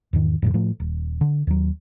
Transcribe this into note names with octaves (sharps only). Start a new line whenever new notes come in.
E2 G#2 D#3
F2 A2 C#3
A2 F3 A3
D#1
D3
D#2 F#3